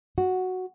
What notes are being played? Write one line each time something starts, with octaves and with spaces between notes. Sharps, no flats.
F#4